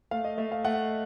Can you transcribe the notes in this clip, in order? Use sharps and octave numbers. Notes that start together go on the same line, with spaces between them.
A3 F5
D#5
A3 E5
F5
A3 F#5